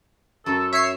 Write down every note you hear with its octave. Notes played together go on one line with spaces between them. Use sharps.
F#2 A4
C#5 E5 C7